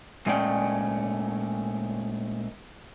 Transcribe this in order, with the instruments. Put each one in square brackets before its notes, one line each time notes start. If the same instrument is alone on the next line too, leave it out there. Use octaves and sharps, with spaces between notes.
[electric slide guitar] A#2 G#3 A3 C#4 D5 G5